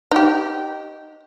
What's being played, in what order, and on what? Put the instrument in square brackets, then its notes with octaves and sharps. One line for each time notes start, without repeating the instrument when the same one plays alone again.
[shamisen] D#4 G4